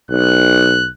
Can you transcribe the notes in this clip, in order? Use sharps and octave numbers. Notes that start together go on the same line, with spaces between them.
B1 F#6